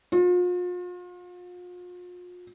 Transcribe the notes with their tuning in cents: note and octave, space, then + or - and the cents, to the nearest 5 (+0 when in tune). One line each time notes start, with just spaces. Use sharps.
F4 +40